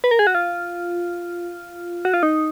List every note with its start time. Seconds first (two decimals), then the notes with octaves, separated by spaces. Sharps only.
0.04 B4
0.11 A#4
0.19 G#4
0.27 F#4
0.35 F4
2.05 F#4
2.14 F4
2.23 D#4